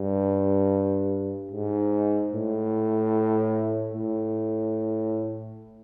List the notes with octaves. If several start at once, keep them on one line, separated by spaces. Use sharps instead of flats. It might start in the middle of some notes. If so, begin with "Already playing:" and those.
Already playing: G2
G#2
A2
A2